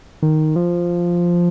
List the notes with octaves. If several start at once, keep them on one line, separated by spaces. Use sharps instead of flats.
D#3
F3